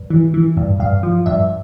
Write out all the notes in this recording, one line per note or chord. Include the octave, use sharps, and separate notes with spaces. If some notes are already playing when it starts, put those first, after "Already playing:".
Already playing: G2
E3
E3
G2
G2 F5
F3
G2 E5